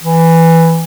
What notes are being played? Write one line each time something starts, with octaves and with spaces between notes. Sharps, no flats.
E3